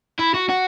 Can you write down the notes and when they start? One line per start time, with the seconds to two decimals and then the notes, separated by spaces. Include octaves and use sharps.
0.19 E4
0.34 F#4
0.49 F#4